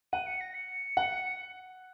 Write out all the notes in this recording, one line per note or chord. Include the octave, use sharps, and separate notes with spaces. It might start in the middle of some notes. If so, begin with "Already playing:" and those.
F#5 D#7
C#7
A#6
C#7
F#5